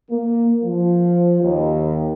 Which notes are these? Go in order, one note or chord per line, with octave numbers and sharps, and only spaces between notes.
A#3
F3
D#2